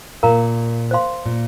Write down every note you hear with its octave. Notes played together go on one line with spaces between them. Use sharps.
A#2 A#4 F5 A#5
C5 F5 C6
A#2